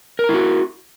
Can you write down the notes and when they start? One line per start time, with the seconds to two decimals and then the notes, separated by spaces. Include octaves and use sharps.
0.19 A#4
0.24 A#5
0.29 E4
0.34 F#4